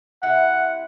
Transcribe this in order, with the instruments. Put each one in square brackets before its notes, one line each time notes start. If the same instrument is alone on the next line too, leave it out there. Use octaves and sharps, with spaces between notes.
[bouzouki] C3 E4 [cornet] F#5